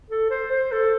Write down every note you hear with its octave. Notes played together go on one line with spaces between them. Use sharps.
A4
C5
C5
A4